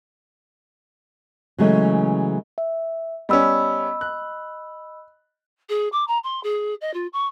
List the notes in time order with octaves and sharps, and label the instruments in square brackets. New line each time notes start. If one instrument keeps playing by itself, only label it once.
[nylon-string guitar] C#3 E3 F#3 G#3 A3 C#4
[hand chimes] E5
[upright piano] G3 B3 C#4 [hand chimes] D#5 B5 E6
[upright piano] F#6
[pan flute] G#4
D6
A#5
C6
G#4
D#5
F4
C#6